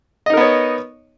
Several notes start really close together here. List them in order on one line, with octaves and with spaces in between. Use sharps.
D#5 D#4 A#4 B3 C#5